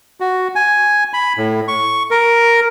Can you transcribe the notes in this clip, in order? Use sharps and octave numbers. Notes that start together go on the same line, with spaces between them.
F#4
G#5
B5
A2
C#6
A#4